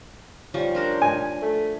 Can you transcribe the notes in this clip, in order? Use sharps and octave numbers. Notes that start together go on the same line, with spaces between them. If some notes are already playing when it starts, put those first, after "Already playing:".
F3 G3 C#4 C#6
D4 A#4 C5
G#5
A3